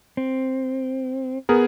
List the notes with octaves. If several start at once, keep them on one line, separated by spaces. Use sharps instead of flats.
C4
B3 G#4 A#4